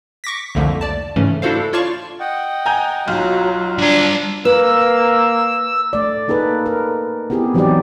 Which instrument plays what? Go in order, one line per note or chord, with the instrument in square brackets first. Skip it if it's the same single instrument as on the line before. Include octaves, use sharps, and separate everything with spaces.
[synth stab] C#6 D6 A#6 B6
C2 F2 D3 F3 A3 A#3
D5 A5
G#2 C#3 E3 A3 C#4
D4 E4 F#4 A4 C5 F5
F4 C#5 D5 F5 A5 C#6
[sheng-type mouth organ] D#5 F#5 G5
[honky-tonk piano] G#5 A#5 G6
[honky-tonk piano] B1 [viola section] F#3 [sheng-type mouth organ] F4 F5
[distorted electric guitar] G3 A#5 [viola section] D4
[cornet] A#3 [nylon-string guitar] B4 [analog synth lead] E6
[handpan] A3 D5
A#3 D#4 G#4 A4 B4
A#4
B3 C4 E4 G4 G#4
E3 F#3 C4 D#4 G4 D5